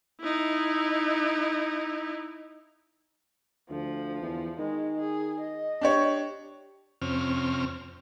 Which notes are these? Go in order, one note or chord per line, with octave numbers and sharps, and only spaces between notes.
D#4 E4
D2 F3
E2
D#3 G#3
G#4
D#5
D4 G4 C#5
F2 C3 C4 C#4 F6